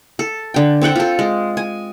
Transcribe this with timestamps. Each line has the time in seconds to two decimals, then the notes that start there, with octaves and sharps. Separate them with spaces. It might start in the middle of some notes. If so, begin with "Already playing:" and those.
0.19 A4
0.54 D3 G5
0.82 C4 A4 F#5 G5
0.96 F4 A4
1.19 G#3
1.57 G#5